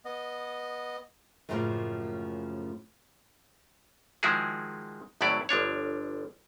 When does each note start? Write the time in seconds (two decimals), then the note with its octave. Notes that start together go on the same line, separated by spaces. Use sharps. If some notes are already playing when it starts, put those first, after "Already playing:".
0.05 B3 D#5
1.49 F#2 A2 C#3 F3 G#3 A#3
4.23 D#3 F3 G#3 E4 F#4 G#4
5.21 G#1 A2 F#3 E4 D5 F5
5.49 G1 F3 D4 C#5